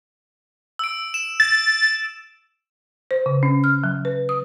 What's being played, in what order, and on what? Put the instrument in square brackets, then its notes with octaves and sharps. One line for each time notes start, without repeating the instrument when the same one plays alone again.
[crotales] E6 D7
E7
[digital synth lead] A6
[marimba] C5
C#3
C#4
F6
F#3
B4
D#6